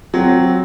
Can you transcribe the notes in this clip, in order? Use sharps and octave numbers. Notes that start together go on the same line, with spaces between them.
F#3 C4